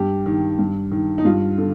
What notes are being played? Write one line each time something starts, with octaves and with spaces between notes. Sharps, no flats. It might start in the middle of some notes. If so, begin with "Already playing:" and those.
Already playing: G2 G4
D#3
G2
D#3
D#4
G2 F4
D3